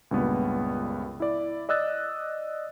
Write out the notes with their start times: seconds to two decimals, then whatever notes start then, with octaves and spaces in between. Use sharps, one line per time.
0.11 C#2 G2 A#2 B3
1.20 E4 D5
1.69 D5 D#5 E6 F#6 A6